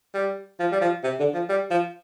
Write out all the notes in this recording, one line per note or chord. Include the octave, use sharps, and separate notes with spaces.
G3
F3
G3
F3
C3
D3
F3
G3
F3